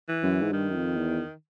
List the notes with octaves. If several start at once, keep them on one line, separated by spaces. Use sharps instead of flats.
E3
F#2
G#2
G2 D#3
F#2
F2
E2